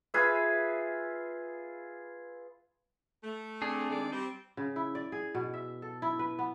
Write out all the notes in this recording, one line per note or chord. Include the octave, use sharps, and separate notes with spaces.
F4 G#4 B4 E5
A3
C4 D4 G#4
D#3 G#3 D5
G3 C4
C#3
E4
D5
G#4
B2
E5
A4
E4
B4
B3